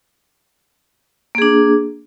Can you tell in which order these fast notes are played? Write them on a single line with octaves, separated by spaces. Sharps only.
A#3 G#4 D4